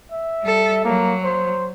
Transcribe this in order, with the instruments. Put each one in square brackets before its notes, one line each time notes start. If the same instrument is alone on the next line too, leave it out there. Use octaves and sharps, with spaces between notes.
[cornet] E5
[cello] G3 A4
[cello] F#3 [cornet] A#3
[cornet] C5